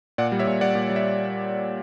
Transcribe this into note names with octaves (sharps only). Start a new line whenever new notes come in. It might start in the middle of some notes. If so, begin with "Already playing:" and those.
A#2 D5 F#5
G3
C#5 E5
A#2
G3 D5 F#5
A#2
G3
E5